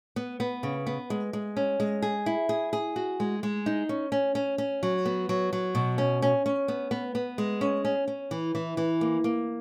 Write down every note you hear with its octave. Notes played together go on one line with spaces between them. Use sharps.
B3
B3
C#3
B3
G#3
G#3
C#4
G#3
G#4
E4
G#4
G#4
F#4
G#3
G#3
D#4
C#4
C#4
C#4
C#4
F#3
B3
F#3
F#3
B2
C#4
C#4
C#4
B3
B3
B3
G#3
C#4
C#4
C#4
E3
E3
E3
A#3
A#3